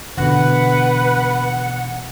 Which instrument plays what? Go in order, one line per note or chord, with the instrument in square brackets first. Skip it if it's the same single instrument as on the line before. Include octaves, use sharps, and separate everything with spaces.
[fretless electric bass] B2 D3 E3 [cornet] B4 [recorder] F#5